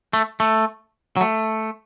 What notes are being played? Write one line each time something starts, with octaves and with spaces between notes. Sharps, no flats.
A3
A3
F#3
A3